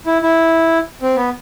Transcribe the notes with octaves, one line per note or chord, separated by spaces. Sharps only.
E4
E4
C4
B3